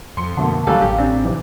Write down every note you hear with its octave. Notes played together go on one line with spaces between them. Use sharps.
F2 C6 C#7
F2 B2 D3 A3 A#3
D#2 F#3 G3 A4 F5 G#5
A1 G4
C4 D4
C3 E3